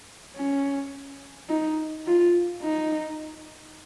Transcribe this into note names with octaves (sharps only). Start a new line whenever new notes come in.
C#4
D#4
F4
D#4